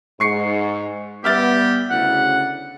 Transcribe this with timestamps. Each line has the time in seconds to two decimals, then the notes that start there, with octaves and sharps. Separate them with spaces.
0.20 G#2 C#6 C7 C#7
1.24 G3 B3 G4 E5 F6 A6
1.90 D2 C#3 E4 F#5